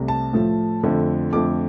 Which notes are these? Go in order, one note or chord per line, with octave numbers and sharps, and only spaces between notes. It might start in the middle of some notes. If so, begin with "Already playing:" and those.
Already playing: C2 C3 A3
A5
A2 F3 A3
F2 D3 F3 A3
F2 D3 F3 A3 D6